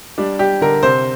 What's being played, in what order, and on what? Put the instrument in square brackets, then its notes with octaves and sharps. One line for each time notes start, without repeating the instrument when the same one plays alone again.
[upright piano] G3 D4
G3 G4
D3 A#4
C3 C5